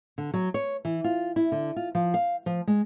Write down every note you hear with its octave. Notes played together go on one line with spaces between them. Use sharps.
D3
F#3
C#5
E3
F4
E4
D3
F4
F3
F5
F3
G#3